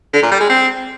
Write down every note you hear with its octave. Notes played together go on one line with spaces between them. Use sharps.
D3
A#2
G3
G#3
C4